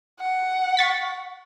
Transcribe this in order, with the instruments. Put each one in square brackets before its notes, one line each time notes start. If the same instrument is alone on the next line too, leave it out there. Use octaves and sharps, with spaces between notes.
[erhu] F#5
[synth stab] C#6 A6 B6